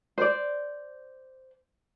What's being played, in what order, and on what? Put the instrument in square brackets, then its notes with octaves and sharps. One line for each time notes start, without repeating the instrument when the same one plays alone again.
[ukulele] C5 D5